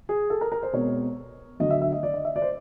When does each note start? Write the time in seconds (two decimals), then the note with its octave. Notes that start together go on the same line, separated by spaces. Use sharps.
0.09 G#4
0.30 A4
0.41 A#4
0.52 A#4
0.63 C5
0.73 B2 G#3 C4 C#5
1.60 D2 D3 F#3 D#5
1.70 E5
1.82 E5
1.92 D#5
2.03 D5
2.14 D#5
2.25 E5
2.36 D5
2.42 C5